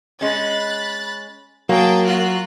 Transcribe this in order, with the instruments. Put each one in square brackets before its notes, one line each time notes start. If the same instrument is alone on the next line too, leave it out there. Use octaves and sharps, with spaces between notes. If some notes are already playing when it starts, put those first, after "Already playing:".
[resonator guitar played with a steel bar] G#3 C#4 [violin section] B5 F#6 A6
[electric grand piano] F#3 [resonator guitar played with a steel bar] A#3 [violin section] G#4 G5 A5
[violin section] F4 F#4 F#6